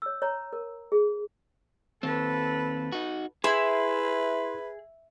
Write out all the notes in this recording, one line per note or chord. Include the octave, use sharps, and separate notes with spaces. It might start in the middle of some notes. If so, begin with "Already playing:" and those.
C#5 E6
C#5 A#5
A#4
G#4
D#2 C4 A4 B4
D#4 F#4
E4 G#4 B4 C6